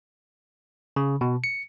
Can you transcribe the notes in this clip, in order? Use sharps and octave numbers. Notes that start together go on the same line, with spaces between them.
C#3
B2
C#7